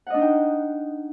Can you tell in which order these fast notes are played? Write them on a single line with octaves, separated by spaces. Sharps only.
F#5 D#5 D4 D#4 G5